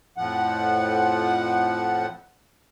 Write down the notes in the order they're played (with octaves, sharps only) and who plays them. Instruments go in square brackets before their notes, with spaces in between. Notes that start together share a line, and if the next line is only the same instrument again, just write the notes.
[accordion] F2 A2 F3 F#5